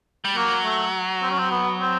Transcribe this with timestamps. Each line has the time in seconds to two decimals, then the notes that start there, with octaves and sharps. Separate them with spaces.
0.25 G3
0.36 F#3 A#3
0.65 A3
1.23 C4
1.31 C#4
1.39 C4
1.51 B3
1.81 C4